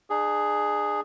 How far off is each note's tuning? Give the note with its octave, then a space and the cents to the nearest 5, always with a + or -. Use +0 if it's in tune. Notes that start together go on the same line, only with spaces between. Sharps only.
D4 +40 G#4 +0